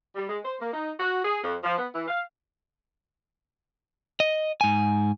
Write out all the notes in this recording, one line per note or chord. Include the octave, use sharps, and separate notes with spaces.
G3
G#3
C5
A#3
D#4
F#4
G#4
F2
F3
B3
E3
F5
D#5
G#2 G#5